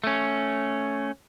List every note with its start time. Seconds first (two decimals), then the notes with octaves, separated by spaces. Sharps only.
0.04 A3 C#4